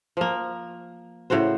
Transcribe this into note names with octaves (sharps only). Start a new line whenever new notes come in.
F3 A#3
A2 C#3 F#4 C5